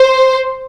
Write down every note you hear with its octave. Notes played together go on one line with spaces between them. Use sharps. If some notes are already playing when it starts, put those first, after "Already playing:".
Already playing: C5